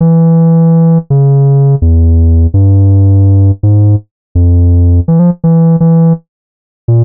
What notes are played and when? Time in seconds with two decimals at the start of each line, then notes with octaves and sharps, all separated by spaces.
0.01 E3
1.10 C#3
1.82 E2
2.54 G2
3.63 G#2
4.35 F2
5.08 E3
5.19 F3
5.44 E3
5.80 E3
6.88 A#2